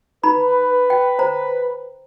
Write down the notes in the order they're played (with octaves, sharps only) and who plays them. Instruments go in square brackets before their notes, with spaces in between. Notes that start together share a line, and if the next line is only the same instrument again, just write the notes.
[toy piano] D#4 A#5 B5 [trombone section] B4
[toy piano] G5
C5 A#5